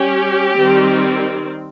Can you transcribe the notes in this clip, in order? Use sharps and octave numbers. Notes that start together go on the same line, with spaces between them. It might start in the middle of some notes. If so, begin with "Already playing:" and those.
Already playing: G3 C#4 G4
D#3 G3 C4